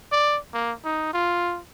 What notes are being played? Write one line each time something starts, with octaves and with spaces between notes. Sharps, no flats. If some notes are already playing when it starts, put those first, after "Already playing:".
D5
A#3
D#4
F4